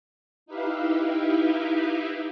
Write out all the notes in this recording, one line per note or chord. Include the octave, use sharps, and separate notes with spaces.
D#4 E4 G4 B4 E5 F5